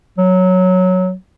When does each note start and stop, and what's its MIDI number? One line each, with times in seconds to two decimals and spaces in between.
0.18 1.14 54